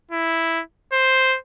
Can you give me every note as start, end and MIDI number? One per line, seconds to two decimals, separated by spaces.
0.11 0.62 64
0.93 1.38 72